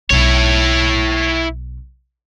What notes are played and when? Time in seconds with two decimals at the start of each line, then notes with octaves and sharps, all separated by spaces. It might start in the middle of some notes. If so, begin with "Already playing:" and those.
0.10 B1 D#4 E4 C#5